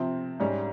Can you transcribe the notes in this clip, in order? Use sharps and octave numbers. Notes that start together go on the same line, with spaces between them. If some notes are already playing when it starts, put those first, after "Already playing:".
Already playing: C3 F3 C4
G#2 G3 C#4